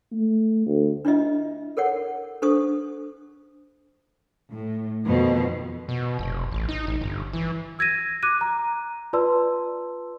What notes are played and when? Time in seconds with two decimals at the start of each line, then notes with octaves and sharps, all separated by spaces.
0.12 A3
0.66 D2
1.05 D4 E4 F4 D#5 E5
1.77 A4 A#4 C#5 F#5
2.42 D4 A4 C5 C#6 D#6
4.51 A2
5.06 F2 B2 D#3
5.89 B2
6.19 F1
6.52 A1
6.69 D#4
6.87 A1
7.01 G1
7.33 E3
7.79 E6 G#6 A#6 D#7
8.23 D6 F#6 D#7
8.41 A#5
9.13 F4 B4 D5 A5 C6 E6